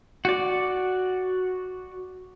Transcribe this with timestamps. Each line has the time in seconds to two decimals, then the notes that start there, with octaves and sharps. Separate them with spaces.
0.25 F#4 D5